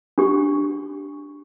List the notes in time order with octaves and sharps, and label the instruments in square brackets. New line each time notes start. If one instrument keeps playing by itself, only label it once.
[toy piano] D4 G4 C#6